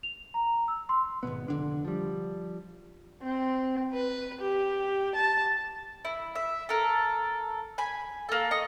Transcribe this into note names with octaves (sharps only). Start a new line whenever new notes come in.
F7
A#5
E6
C6
G#1 D#2 B2 B3
F1 D3 D4
F3 G3
C4
B4
G4
A5
E4
E5
A4 A#4
G#5 B5
A#3 A4
D#5 C#6